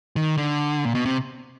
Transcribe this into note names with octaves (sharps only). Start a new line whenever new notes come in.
D#3
D3
A#2
B2
C3